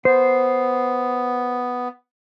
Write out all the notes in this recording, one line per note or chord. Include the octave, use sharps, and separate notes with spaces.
B3 C5